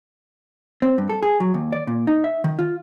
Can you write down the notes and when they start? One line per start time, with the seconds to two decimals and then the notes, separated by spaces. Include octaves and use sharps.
0.82 C4
0.98 G2
1.09 A4
1.23 G#4
1.40 F#3
1.54 D#2
1.72 D5
1.87 A#2
2.07 D#4
2.24 E5
2.44 D#3
2.59 F4